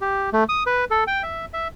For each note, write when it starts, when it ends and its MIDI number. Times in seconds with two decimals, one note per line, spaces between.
0.01 0.30 67
0.33 0.44 57
0.49 0.63 87
0.66 0.85 71
0.91 1.04 69
1.07 1.23 79
1.23 1.46 76
1.53 1.68 76